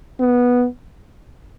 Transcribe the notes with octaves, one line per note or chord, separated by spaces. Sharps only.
B3